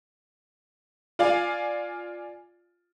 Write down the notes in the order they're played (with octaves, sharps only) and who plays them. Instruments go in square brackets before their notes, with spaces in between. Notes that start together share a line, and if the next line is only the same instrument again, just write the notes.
[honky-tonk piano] F4 D5 F5 G#5